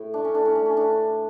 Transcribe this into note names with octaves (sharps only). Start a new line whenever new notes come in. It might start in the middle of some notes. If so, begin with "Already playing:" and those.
Already playing: A2
A3 D4
C#4
A2 D4
C#4
A2 D4
C#4
A2 D4
E3